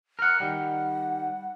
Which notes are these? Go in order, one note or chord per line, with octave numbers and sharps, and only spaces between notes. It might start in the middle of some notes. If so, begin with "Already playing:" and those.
A#4 F#5
D#3 G3 F#5